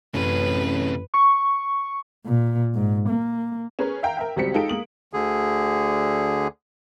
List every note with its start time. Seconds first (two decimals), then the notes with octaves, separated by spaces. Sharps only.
0.14 A1 F#2 C3 C#4 B4
1.14 C#6
2.26 A#2
2.74 G#2
3.09 A#3
3.79 C#4 G#4 A#4 B4
4.03 E5 F5 G5 A#5
4.17 A#4 E5 G5
4.36 C#2 F#3 G3 C4 B6 C#7
4.54 G#3 D#4 F4 A4 G5 D7
4.69 G#3 A#3 D#6 F#7
5.13 D2 D3 G#4